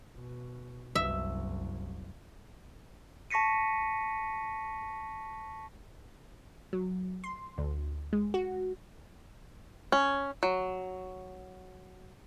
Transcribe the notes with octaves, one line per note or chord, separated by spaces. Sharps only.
B2
F#1 C2 E5
A5 C#6 A#6 B6 C#7 D#7
F#3
C6
D2
G#3
F#4
C#4
F#3